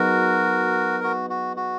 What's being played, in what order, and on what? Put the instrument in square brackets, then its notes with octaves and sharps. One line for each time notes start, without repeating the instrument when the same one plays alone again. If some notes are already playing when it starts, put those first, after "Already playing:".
Already playing: [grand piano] F#3 B3 D#4 G#4 [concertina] F#4 A#4
[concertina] F#4
F#4
F#4